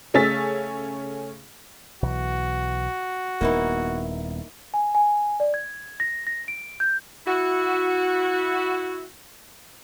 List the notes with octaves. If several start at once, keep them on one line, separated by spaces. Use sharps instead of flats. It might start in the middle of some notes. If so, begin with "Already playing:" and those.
C#3 A3 C#4 E6 A6 B6
B1 E3 F#4
D#1 A#3 B3 D#4 E4
G#5
G#5
D5
G#6
A#6
A#6
D7
G6
E4 F#4